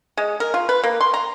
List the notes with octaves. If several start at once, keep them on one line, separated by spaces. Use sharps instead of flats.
G#3
A#4
F4
B4
A#3
C6
A#5